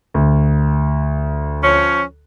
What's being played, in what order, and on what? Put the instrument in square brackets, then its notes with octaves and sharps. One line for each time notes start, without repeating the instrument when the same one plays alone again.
[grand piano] D2
[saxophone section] F3 C#4 C#5